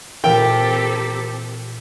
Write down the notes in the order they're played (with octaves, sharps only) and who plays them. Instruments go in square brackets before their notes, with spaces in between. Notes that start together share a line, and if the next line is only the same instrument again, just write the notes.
[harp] A#2 E3 E6 [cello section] C4 G4 A4 [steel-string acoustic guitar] A#4 [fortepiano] G5